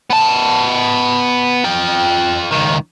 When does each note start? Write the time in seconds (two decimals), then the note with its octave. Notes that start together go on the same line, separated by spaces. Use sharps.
0.10 B3 A5
1.65 F4 G5
2.51 C#2 D#3